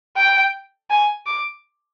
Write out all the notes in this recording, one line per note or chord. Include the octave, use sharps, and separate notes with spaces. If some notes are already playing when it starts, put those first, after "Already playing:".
G5
G#5
D6